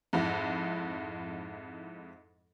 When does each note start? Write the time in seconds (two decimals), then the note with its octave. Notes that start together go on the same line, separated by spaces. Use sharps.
0.13 F2 G#2 E4